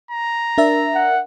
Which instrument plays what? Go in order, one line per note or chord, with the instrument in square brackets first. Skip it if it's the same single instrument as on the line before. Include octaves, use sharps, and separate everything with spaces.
[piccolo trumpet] A#5
[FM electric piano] D4 A#4 E5
[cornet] F#5